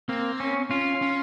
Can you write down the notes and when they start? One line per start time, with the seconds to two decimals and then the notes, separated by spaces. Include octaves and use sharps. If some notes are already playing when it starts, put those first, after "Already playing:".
0.09 A#3 C4
0.40 C#4
0.70 C#4 F4
1.02 C#4